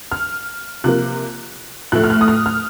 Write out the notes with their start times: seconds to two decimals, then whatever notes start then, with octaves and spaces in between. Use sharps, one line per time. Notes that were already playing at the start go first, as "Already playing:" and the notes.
0.12 F6
0.84 C3 F3 A#3 F#6
1.92 A2 F3 A3 F#6
2.04 F6
2.10 F#6
2.21 D#6
2.28 F6
2.46 F6